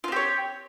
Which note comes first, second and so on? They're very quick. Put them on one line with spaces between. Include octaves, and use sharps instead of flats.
F4 C4 G4 C#5